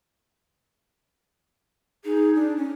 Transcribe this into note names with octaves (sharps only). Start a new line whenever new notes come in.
D#4 G#4
D4
C#4